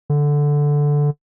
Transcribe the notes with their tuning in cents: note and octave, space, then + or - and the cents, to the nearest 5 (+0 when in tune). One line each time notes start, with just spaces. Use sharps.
D3 -5